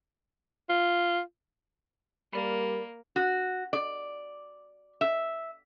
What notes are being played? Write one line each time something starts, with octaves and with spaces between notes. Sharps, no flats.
F4
G3 A#3 A#4 D5 B5
F#4
D5
E5